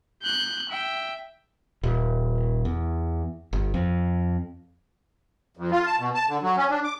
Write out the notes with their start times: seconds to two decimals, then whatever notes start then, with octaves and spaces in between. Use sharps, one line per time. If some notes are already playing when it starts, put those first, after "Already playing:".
0.23 F#6 G6
0.69 E5 G5
1.83 D#1
2.65 E2
3.53 G1
3.74 F2
5.57 F2
5.71 F4
5.86 A5
5.99 B2
6.15 A5
6.29 D3
6.42 F#3
6.57 C#4
6.70 D4
6.84 D6